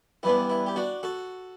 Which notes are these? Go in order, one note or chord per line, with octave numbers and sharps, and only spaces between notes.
G2 E3 B3 D4 E4
E4
G4
D4 F#4
F#4 A4